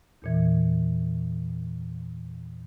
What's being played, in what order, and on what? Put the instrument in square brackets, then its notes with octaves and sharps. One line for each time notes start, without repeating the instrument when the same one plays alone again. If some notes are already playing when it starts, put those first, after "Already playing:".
[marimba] E2 A#2 E3